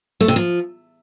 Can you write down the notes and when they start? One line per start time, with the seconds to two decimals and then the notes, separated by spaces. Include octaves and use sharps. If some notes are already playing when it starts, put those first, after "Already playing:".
0.21 A3
0.28 C3
0.36 F3